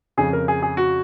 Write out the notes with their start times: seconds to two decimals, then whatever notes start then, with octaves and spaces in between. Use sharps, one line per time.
0.17 F2 C#3 G#4
0.33 A#4
0.48 G#4
0.63 G#4
0.77 F#4